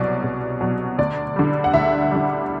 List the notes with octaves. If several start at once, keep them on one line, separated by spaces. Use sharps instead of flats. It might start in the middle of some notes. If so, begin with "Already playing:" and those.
Already playing: C2 B2 F#3 D5
C2
B2 F#3
D2 D5
D3 G3
F#5
D2 E5
D3 G3